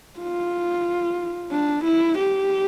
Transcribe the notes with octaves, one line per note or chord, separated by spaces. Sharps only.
F4
D4
E4
G4